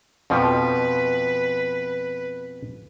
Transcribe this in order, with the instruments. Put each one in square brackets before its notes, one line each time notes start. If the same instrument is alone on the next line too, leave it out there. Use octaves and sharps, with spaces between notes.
[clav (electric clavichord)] F2 B2 F3 [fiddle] B4